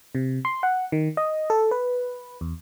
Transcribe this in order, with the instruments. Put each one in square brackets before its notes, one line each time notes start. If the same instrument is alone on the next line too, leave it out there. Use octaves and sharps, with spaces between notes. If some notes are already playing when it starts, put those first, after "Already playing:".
[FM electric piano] C3
C6
F#5
D#3
D#5
A4
B4
E2